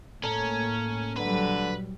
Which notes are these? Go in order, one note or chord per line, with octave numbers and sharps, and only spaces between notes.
A2 A#3 C#4 A4 A5 A#5
A#1 D3 F#3 G3 B4